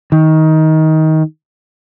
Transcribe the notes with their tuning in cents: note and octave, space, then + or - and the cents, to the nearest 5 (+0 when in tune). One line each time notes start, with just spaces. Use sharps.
D#3 +20